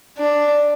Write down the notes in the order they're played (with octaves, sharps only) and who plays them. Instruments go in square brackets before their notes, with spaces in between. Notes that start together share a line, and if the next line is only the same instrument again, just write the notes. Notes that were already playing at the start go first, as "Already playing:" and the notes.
[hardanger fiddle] D4